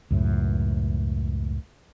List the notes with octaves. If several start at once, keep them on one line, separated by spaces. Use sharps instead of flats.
C#2 F#2 A2